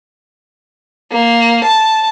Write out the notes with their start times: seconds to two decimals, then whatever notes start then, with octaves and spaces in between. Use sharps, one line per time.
1.12 A#3
1.65 A5